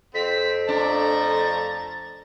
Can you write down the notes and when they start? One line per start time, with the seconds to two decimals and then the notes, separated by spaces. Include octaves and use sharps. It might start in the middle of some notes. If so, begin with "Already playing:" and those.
0.15 F2 C4 B6
0.69 F3 A3 D4 A#5 A6